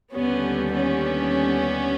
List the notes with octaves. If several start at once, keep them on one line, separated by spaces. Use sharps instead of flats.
D#2 D3 G3 B3 C#4
B3 C#4